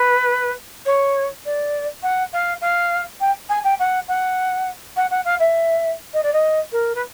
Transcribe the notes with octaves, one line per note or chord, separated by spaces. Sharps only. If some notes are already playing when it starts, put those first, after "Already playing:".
Already playing: B4
C#5
D5
F#5
F5
F5
G5
G#5
G5
F#5
F#5
F#5
F#5
F5
E5
D#5
D5
D#5
A#4
B4